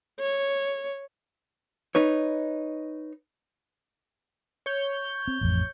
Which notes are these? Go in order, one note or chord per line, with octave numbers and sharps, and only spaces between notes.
C#5
D#4 B4 C#5
C#5 G6
C4
A1 F2